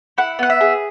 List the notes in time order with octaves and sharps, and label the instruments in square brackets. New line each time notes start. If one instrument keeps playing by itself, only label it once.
[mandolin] E4 F#5
B3 F#5
E5
G#4